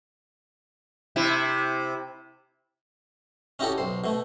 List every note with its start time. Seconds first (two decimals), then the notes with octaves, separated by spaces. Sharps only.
1.16 C3 E4
3.59 C#4 D#4 E4 F#4 G4 A4
3.78 B1 C5
4.04 B2 A3